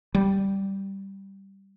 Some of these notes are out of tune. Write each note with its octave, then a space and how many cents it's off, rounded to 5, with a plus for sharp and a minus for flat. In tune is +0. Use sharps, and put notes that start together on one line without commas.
G3 -5